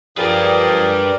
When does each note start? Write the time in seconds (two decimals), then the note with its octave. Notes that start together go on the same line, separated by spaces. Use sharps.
0.17 F3 D4 G4 G#4 A#4 B4 D5